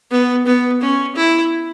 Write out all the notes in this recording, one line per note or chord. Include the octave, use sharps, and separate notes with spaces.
B3
B3
C#4
E4